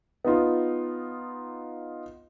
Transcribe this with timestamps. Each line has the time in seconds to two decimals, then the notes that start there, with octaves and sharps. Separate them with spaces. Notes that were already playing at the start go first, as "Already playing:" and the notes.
0.25 B3 D#4 F4